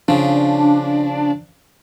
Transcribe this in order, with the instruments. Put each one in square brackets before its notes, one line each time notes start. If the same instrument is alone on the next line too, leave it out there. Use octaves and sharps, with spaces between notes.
[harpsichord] C#3 F3 [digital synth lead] D4